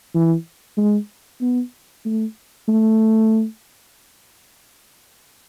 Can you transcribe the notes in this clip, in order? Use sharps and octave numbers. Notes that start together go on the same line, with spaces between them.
E3
G#3
B3
A3
A3